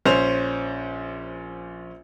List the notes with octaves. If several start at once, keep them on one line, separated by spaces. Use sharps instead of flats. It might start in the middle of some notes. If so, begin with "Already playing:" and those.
A#1 C#4 C5 F7